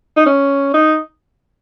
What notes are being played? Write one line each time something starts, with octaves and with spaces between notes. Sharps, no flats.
D#4
C#4
D#4